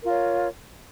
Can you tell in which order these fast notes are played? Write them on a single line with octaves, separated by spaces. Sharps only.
A#4 F4 C#5